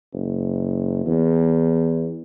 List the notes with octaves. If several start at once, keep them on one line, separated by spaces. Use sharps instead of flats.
F#1
E2